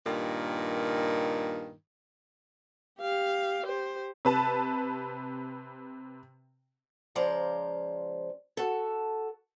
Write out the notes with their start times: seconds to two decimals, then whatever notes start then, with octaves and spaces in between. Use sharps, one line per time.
0.06 G2 A#2 D#3
2.99 G4 F5
3.64 G4 C5
4.25 C3 B4 A5
7.15 C#3 F3 G#3 C5 D5 A#5
8.57 F#4 A4